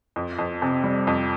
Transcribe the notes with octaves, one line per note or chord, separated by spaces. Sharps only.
F2
F2
C3
G3
F2